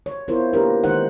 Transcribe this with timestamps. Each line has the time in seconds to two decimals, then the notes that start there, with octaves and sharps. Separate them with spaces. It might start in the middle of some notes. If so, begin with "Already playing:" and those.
0.06 C#5
0.28 B3 E4 F4 A#4 C5
0.53 A#3 D4 F4 G4 A#4 B4
0.84 D#3 G#3 D#4 C5 F#5